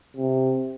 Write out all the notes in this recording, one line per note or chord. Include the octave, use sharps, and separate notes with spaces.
C3